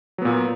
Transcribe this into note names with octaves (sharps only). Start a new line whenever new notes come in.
A#2 F#3 B3